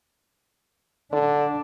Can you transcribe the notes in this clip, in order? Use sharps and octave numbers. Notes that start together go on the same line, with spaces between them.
D3 D4